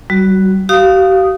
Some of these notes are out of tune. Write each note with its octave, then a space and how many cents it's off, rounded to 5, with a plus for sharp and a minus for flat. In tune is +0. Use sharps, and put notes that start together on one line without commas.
G3 -35 F#4 +0
G4 -45 F5 +0 D#6 +0